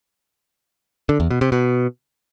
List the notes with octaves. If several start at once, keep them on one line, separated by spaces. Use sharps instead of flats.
D3
E2
B2
C3
B2